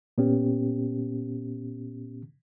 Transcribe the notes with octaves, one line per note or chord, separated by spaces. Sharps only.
A#2 B3 C#4 G4